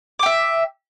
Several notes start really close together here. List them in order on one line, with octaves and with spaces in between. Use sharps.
D6 G5 E5